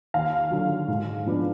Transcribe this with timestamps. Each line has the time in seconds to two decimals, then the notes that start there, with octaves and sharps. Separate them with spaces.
0.14 D#2 F5
0.51 D3 F#3
0.88 G#2
1.26 F3 B3 D4